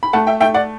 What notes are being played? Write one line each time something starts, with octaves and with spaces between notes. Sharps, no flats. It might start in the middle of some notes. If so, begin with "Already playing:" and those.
B5
A3 F#5 A5
E5 G5
A3 E5 G5
D5 F#5